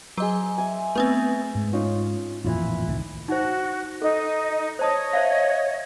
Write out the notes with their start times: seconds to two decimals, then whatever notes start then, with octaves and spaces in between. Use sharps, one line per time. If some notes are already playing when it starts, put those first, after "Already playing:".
0.17 F#3 G#4 C5 D#5
0.58 E5 G#5
0.95 A3 B3 C4 B4 G#5
1.55 G#2
1.73 C#4 D#4 F4
2.44 A1 F2 A#2 E3 E4 F4
2.88 C2 A2 D#3
3.28 D#4 F#4 C5
4.02 D#4 A4 D#5
4.79 C5 C#5 D#5 A5 D#6
5.13 C5 E5 F5